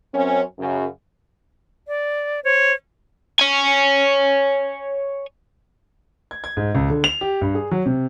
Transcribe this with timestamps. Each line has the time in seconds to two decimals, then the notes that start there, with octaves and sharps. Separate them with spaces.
0.14 F#2 C4 C#4
0.59 F#2 C#3
1.87 D5
2.44 C5 C#5
3.40 C#5 G#5
6.31 G#6
6.44 G#6
6.57 G#2
6.75 C#2
6.90 D3
7.04 F7
7.21 G4
7.41 G2
7.55 G#4
7.71 F#3
7.86 C3